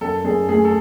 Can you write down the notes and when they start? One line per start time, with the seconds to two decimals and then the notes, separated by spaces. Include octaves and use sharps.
0.01 F#2 A4
0.25 F#2 G#4
0.48 A3 G#4
0.65 A4